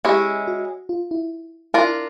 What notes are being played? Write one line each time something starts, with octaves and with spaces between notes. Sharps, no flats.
G#3 C#4 E4 G4
F#4
F4
E4
D4 E4 F4 A#4